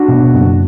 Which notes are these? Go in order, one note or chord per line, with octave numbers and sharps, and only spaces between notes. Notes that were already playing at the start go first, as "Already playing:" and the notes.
Already playing: D4 F#4
B2
F#1